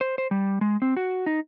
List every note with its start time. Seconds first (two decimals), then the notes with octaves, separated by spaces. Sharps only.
0.01 C5
0.18 C5
0.31 G3
0.61 G#3
0.82 C4
0.97 F#4
1.26 D#4